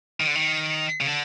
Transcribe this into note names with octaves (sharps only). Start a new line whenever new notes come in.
D#3
D3
D#3
C#3
D3